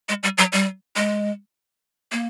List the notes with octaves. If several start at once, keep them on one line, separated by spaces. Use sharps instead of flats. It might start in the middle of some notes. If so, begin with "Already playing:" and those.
G#3
G3
F#3
G3
G#3
A#3